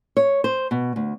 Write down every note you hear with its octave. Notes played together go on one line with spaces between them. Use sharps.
C#5
C5
B2
D2